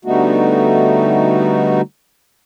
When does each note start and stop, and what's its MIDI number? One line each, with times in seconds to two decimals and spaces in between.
0.05 1.81 50
0.05 1.81 55
0.05 1.81 57
0.05 1.81 59
0.05 1.81 63
0.05 1.81 66